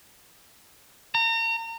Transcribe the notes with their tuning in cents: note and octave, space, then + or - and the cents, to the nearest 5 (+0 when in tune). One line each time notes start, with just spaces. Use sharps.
A#5 -35